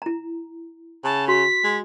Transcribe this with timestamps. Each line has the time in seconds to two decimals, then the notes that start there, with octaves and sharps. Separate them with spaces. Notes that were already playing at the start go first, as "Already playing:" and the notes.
0.02 E4 A#5
1.04 C#3 A5
1.28 F#4 C6 B6
1.64 G#3